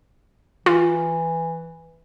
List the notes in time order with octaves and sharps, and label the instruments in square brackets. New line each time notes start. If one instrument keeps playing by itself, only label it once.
[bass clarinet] E3 [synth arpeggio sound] F4